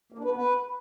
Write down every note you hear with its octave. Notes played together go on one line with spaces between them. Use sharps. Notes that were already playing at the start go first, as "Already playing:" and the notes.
A#3
D4
B4
B3
B4